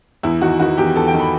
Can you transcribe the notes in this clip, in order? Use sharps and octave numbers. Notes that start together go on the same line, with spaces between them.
E2 E4
D#3 F#4
D#3 F#4
E2 G4
E2 A4
G5
D#3
B5